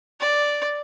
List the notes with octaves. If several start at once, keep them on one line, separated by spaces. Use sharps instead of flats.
D5